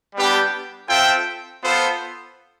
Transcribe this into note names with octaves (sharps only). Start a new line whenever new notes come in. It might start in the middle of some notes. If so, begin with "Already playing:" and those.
G3 B3 D4 G4
C4 F4 A4 E5 G5
B3 F4 A4 C5